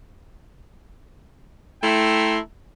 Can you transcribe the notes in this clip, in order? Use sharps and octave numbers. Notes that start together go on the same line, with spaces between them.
A3 E4 E5 G5 A#5 C6